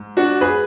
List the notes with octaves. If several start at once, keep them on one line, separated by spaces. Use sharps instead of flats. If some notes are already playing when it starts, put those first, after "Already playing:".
Already playing: G#2
D4 F#4
G#4 B4